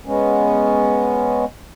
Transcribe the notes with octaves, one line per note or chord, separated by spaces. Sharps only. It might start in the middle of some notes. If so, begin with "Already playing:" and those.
G#3 B3 C#4